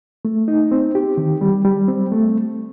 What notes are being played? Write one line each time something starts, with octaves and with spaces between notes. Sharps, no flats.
A3
D#4
C4
G4
D#3
G3
G3
C4
A3